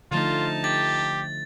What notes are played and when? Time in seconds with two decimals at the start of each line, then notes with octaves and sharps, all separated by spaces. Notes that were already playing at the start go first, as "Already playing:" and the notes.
0.11 D3 F3 A3 D#4 F4 A5
0.64 G4 A6